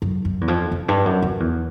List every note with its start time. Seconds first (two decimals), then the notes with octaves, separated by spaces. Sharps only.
0.02 F#2
0.25 F#2
0.41 E2
0.48 F2
0.72 F2
0.88 G2
1.05 F#2
1.22 F2
1.40 E2